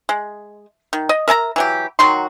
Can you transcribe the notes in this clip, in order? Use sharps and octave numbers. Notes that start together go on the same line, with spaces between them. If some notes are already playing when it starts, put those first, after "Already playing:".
G#3
D#3
D#5
A#4 E5 A5 A#5
E3 F#3 G4
D#3 F#3 F#4 C6